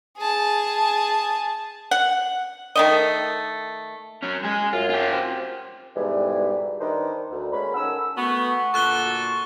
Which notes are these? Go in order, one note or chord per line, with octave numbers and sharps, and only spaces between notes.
G#4 A5
F#5
D#3 A3 D#5
F#3 C#4
G#3 G#4
F#2 F4
F4 G4
C4
G#2 B2 D3 E3 G3
D#3 D4 D#4 B4 C5 D5
D2
G#3 A#3 C#4 B5
D#3 C#4 A4 F#5 E6
A3 B3 F#4
A#2 D3 A4 C#6 F#6 G7